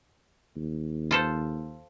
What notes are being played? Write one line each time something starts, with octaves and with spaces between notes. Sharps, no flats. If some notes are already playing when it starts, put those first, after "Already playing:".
D#2
F4 A4 C5